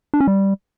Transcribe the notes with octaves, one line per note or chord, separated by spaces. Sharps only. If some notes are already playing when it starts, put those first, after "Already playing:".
D4
C#4
G3